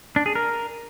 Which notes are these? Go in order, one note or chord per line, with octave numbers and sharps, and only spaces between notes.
D4
G#4
A#4